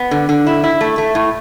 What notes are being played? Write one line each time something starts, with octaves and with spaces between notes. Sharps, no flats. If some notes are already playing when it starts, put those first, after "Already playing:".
Already playing: B3
D3
D3
E4
E4
A3
A3
A2